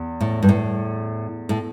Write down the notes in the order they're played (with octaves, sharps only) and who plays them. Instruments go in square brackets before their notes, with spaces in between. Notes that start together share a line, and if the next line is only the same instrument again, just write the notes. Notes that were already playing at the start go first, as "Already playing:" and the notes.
Already playing: [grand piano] E2
[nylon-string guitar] A2
G2
A2
A2